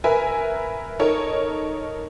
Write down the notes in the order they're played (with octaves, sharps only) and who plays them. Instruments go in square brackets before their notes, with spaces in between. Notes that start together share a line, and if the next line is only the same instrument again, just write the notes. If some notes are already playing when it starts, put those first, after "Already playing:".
[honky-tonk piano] A#4 B4 E5 G#5
D#4 A4 A#4 C#5